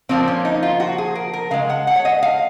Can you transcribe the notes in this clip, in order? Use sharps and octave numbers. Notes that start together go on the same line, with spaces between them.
A#2 F3 A#3 C4
C#4
D#4
F4
F#4
G#4
A#4
A#4
C#3 G#3 F5
F#5
F#5
C#5
D#5
F5